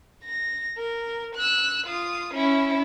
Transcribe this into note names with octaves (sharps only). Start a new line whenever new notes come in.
A#6
A#4
E6 F#6
F4 D#6
C#4 E4